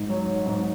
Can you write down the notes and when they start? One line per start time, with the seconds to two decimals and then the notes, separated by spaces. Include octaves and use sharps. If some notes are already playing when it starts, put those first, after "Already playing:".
Already playing: G#2
0.09 F#3
0.46 G#2